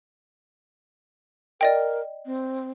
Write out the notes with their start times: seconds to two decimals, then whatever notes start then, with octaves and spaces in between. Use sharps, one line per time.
1.61 A#4 D5 D#5 G5
2.26 C4